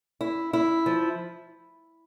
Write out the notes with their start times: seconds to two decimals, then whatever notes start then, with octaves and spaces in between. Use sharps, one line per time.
0.21 E4
0.53 E4
0.86 F3